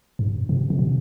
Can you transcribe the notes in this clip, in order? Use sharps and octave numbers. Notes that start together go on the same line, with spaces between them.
G2
C3
C3
B2